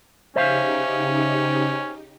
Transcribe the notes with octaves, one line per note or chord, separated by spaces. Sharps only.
C#3 C#4 D#4 G4 C5 E5 F5